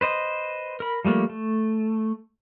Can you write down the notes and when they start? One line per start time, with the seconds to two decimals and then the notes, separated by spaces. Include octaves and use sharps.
0.01 B4 C5 D#5
0.80 A#4 B5
1.05 F3 G3 A3 A#3
1.30 A3